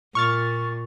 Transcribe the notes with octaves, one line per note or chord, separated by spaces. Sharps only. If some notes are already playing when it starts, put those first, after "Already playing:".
A#2 C#6 F6 A6